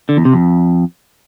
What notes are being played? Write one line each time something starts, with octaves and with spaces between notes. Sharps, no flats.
D3
E2
C3
F2